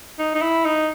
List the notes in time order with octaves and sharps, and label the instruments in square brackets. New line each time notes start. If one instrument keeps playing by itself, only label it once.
[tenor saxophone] D#4
D#4
E4
D#4